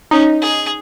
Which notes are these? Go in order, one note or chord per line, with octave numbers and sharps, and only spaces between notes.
C#4 D#4
G#4